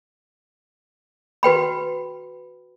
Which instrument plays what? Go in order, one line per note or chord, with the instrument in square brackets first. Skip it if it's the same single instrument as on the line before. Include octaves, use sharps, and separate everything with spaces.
[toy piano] F#4 B4 G5 B5